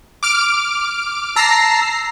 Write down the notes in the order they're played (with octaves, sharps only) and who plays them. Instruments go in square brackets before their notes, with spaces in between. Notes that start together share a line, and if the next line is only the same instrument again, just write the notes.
[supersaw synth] D6 F6 D7
[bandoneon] A5 E6 [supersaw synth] A#5 A#6 C7